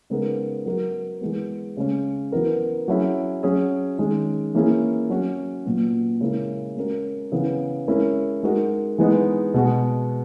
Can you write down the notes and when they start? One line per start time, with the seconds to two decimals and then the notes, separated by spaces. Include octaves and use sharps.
0.10 C#3 G#3 B3 D#4 A#4
0.66 F#3 B3 F#4 A#4
1.21 E3 G#3 B3
1.77 C#3 G#3 C#4
2.32 E3 B3 F#4 A#4
2.88 F#3 C#4 E4 G#4
3.43 F#3 C#4 G#4
3.99 D#3 G#3 C#4
4.54 E3 A#3 C#4 E4 G#4
5.09 F#3 C#4 F#4
5.65 A#2 F#3 B3
6.21 C#3 G#3 C#4 E4 A#4
6.76 G#3 C#4 F#4 A#4
7.32 C#3 E3 B3
7.88 G#3 C#4 E4 A#4
8.43 G#3 D#4 F#4 A#4
8.98 E3 G#3 B3 D#4 G#4
9.54 B2 G#3 B3 F#4